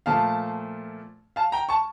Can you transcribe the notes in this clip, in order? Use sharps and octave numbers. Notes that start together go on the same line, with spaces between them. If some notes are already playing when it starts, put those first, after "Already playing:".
A#2 F3 A3 F5 A5
F5 A5
G5 A#5
A5 C#6